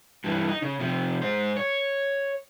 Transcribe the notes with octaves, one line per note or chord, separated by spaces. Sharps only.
G2 E3
D#4
C#3
C3 F3
G#2 C5
C#5